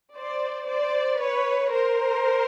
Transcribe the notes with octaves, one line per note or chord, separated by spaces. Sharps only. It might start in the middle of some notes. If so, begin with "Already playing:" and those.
C5 D5
C5 D5
B4 C#5
A#4 C5